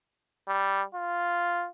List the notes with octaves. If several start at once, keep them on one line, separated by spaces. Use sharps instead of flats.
G3
F4